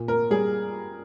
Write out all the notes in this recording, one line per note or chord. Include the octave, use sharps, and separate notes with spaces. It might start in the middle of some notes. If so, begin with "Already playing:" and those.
Already playing: A#2
A#3 A#4
G3 G#4